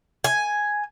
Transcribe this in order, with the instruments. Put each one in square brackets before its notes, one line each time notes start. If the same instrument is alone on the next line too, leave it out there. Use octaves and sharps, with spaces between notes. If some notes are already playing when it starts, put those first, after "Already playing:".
[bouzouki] G#5